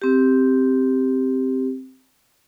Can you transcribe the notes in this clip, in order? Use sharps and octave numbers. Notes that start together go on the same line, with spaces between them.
C4 G4